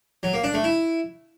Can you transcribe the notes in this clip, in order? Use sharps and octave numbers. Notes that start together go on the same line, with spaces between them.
F#3
A#3
D4
A3
E4